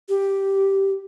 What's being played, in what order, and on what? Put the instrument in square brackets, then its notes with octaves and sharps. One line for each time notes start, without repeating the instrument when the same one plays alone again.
[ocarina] G4